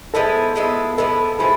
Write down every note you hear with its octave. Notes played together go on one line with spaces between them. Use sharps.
F3 G#3 B3 E4 A4
F3 G#3 B3 E4
F3 G#3 B3 E4 A4
F3 G#3 B3 E4 G#4